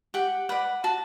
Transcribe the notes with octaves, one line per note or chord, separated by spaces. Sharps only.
G4 F#5
B4 D5 F#5
F#4 A5